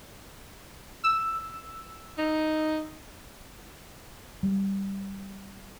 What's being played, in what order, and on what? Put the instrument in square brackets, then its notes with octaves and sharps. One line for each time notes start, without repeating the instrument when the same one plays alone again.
[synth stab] E6
[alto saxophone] D#4
[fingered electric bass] G3